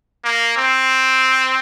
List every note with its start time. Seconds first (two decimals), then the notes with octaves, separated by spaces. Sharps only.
0.24 A#3
0.57 C4